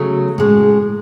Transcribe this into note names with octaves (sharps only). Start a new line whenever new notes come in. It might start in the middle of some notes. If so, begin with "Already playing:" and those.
Already playing: C#3 F#3 A3
A2 G#3 C#4